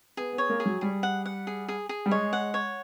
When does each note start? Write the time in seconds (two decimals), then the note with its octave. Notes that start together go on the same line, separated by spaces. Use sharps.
0.17 B3 G#4
0.33 B3
0.38 C#5
0.49 A#3
0.60 G#4
0.66 F#3
0.81 G3 G#4
1.03 F#5
1.25 F#5
1.47 G#4
1.69 G#4
1.89 G#4
2.06 G3
2.11 G#3 C#5
2.33 F#5
2.54 C#5